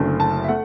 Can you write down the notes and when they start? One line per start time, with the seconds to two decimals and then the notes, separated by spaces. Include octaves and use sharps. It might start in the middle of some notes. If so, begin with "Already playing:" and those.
Already playing: F#1 F#2 D3 A3
0.20 A5
0.44 E5
0.49 A3 F#5